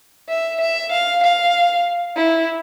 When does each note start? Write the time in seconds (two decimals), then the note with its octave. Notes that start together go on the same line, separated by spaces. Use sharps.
0.30 E5
0.61 E5
0.92 F5
1.23 F5
2.16 E4